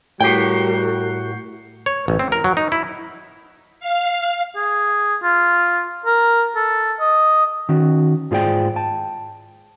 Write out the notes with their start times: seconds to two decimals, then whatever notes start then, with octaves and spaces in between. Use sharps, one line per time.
0.21 A2 G3 F#4 A#4 G5 G6 C7 C#7
1.86 C#5
2.08 A1
2.19 C4
2.32 A#4
2.44 F#3
2.57 D#4
2.72 E4
3.80 F5
4.56 G#4
5.23 F4
6.06 A#4
6.56 A4
7.00 D#5
7.69 D#3 C#4 F#4
8.31 G#2 F4 G#4 C5 D5 G5
8.76 G5 A5